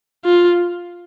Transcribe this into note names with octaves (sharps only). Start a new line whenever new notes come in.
F4